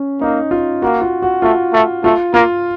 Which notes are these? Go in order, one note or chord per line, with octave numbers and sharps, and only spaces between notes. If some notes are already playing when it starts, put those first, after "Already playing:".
Already playing: C#4
A#3 D#4
F4
A#3 F#4
F4
F#4
A3 F4
A3
A3 F4
A#3 F4